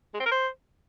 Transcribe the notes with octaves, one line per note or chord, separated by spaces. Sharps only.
G#3
C4
A#4
C5